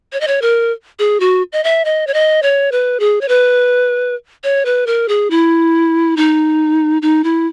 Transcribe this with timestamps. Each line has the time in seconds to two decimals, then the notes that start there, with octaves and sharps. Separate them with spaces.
0.13 C#5
0.21 D#5
0.27 C#5
0.42 A#4
0.99 G#4
1.20 F#4
1.52 D#5
1.64 E5
1.85 D#5
2.07 C#5
2.14 D#5
2.43 C#5
2.72 B4
3.00 G#4
3.21 C#5
3.28 B4
4.44 C#5
4.65 B4
4.87 A#4
5.08 G#4
5.30 E4
6.17 D#4
7.02 D#4
7.24 E4